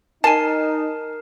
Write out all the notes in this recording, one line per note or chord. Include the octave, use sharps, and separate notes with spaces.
D#4 A#4 G#5 A5 C7